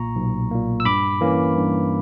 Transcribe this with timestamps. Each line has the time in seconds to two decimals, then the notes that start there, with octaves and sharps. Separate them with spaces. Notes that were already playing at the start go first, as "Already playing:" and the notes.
Already playing: B1 A#2 A#3 A#5 C#6
0.16 B1
0.51 A#2 A#3
0.80 E6
0.85 G2 B5 D6
1.21 E3 A#3 C#4
1.56 G2